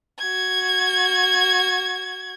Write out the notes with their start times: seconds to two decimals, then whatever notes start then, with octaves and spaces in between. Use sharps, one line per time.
0.20 F#4 G#6